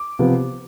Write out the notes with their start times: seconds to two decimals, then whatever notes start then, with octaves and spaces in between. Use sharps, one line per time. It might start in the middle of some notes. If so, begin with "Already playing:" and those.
Already playing: D6
0.19 C3 F3 B3